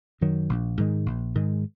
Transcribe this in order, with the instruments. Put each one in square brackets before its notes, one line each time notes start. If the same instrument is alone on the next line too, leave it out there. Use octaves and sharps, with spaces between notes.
[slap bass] F#2 D#3 F#3
A#1
G#2 D#3 G#3
A#1
G#2 D#3 G#3